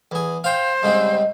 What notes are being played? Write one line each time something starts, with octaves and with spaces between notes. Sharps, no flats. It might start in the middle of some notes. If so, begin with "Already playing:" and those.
E2 G#4
C5 F5 G5
G#2 C#3 G3 C4 D#5